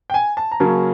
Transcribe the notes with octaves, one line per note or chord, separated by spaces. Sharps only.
G5
G#5
A5
A#5
C#3 F#3 A#3 C#4 A5